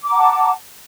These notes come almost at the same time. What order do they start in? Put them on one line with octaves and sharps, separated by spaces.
D6 A#5 F#5 A5